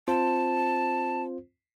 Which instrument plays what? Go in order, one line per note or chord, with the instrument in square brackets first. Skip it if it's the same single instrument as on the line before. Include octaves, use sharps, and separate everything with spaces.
[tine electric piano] C4 F4 C5 [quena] A5